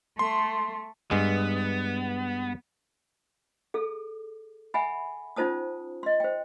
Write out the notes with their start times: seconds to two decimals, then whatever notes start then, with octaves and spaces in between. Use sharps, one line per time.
0.19 A3 C6
1.11 G2 G#3 B3
3.74 G#4 A4
4.74 E5 F#5 G#5 B5
5.36 C#4 D#4 F4 C5 A5 D#6
6.03 D#5 C6
6.20 C5 G5